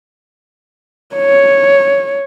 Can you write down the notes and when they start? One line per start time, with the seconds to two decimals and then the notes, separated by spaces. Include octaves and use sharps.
1.16 C#5